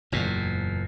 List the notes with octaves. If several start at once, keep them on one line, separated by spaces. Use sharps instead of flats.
F#1 E2 A#2